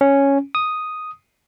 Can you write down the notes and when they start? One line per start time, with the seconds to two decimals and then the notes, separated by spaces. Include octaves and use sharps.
0.01 C#4
0.55 D#6